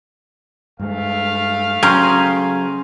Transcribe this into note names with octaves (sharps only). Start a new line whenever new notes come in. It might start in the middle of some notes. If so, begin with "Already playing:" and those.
G2 G#3 A3 F5
C#3 F#3 C#4 G#4 G5 A#5 C6